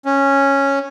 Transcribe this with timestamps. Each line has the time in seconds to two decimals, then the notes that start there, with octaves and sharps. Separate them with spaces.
0.05 C#4